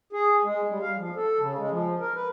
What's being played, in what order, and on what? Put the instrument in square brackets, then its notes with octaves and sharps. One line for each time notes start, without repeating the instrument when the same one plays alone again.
[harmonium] G#4
G#3
G3
F5
F3
A4
C#3
G#3
F3
A#4
B4